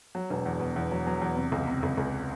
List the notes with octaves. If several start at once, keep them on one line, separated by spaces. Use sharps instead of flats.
F#3
E1
E2
B2
E2
F#3
F#3
E2
C3
C#2
C3
C#2
C#2